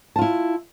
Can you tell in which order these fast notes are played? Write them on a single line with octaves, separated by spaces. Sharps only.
A5 F4 E4